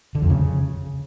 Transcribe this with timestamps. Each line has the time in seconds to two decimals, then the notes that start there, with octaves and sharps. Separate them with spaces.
0.15 D3
0.22 F2
0.30 C#3